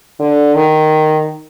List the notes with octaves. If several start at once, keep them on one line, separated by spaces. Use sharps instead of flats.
D3
D#3